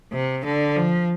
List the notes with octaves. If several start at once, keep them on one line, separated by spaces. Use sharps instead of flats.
C3
D3
F3